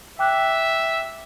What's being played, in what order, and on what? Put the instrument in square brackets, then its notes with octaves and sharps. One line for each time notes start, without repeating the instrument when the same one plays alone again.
[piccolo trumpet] E5 [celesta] G5 D6 F#6